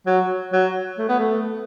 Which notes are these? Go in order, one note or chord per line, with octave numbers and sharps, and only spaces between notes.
F#3
F#3
A3
B3
A3